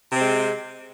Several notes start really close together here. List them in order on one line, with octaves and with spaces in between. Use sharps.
C3 C4 G#3